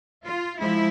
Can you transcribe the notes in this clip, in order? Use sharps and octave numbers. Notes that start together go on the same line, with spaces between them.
F4
F3 G#3 E4